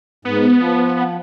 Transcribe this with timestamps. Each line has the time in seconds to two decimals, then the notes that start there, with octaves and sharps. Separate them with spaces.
0.25 G#2 B3
0.59 F3